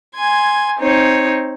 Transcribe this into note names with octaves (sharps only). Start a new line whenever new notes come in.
G#5 C6 G#6
C4 D#4 C#5